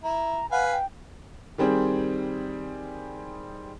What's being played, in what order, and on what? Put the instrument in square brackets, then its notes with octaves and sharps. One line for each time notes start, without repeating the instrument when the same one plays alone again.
[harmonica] E4 [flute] A#5
[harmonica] B4 F5 G#5 [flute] F#5
[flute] G5
[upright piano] D#3 G3 C4 G#4